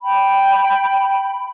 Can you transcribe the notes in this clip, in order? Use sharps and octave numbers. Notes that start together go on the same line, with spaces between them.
G5 B5